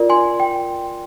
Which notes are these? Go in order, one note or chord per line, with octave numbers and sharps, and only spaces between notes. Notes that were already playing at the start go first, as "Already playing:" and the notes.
Already playing: F4 A#4 D5
G#5 C6
G5